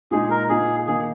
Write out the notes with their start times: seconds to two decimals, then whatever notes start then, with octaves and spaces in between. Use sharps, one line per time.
0.11 A#2 G#3 D#4 G#4
0.30 A#4
0.49 A#2 A#3 D#4 G#4
0.87 D#3 A#3 D#4 G#4